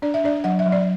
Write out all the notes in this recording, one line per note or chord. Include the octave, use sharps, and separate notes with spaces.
D4 D5
E5
D4 D5
F#3 F#5
E5
F#3
D5